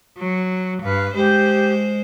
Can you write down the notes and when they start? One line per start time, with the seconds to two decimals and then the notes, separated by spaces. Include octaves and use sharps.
0.18 F#3
0.82 G2 B4 F5
1.15 G#3 G4 C5